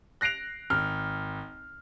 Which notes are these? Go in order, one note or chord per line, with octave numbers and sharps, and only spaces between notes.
F#6 A#6 C7 D7 F7
G#1 F6